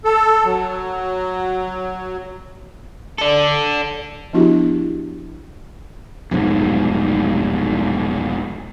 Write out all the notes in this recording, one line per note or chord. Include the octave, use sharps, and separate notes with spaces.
A4
F#3
A4 D5
F3 B3 D4 E4 F#4 G4
F1 B1 G#2